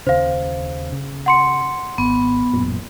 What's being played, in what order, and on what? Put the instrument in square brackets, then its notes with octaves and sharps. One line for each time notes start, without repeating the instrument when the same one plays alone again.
[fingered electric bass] D#2 C#3 [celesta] C5 F5
[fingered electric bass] C#3
[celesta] F#5 C6 C#7
[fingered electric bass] G#1 [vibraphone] B3
[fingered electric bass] A1 F#2 A#2